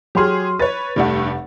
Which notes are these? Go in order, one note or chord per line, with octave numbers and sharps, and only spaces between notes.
F#3 G4 G#4 C6 F6
B4 C#5 A6
F1 G2 G3 A3 F#5